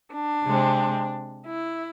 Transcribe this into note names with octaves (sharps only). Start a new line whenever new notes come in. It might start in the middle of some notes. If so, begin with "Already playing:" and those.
D4
C3 G#3 C4
E4